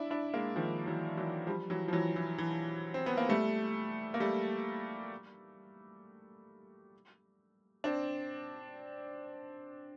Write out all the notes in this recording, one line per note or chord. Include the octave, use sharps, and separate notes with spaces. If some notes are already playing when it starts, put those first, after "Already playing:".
Already playing: D4 E4
D4 E4
G#3 A#3
D#3 F3
E3 F#3
E3 F#3
F3 G3
E3 F#3
F3
E3 F#3
E3
E3
C4
B3
A#3
G3 A3
A#3
G3 A3
C4 D4